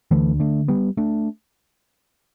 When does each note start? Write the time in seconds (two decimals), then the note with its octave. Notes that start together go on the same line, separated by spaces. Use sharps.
0.11 D2 D3 E3 A3
0.40 A3 D4
0.68 G3 B3
0.97 A3 D4